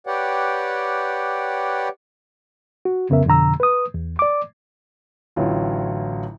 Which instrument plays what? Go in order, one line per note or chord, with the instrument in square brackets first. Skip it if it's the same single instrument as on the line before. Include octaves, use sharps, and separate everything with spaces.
[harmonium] G4 B4 C#5 D5 F#5 G5
[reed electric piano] F#4
C2 F2 C#3 B3 A#4 E5
F2 B2 D3 A#5 E6
B4 D#6
E2
D5 D6
[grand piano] A1 A2 D3 F#3 E4 F4